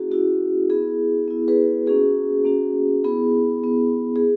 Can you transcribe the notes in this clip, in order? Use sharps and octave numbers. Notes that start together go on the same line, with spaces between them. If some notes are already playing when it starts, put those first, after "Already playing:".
Already playing: A#3 C#4 E4 F#4 G#4
A#3 C#4 E4 F#4
B3 E4 G#4
B3 E4
G#4 B4
A#3 C#4 F#4 G#4
A#3 C#4 F#4
B3 E4 G#4
B3 E4
G#4